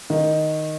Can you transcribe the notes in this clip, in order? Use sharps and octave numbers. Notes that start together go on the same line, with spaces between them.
D#3